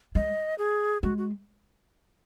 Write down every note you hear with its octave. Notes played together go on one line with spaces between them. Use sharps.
G#3 D#5
G#4
G#3 F#4
F#4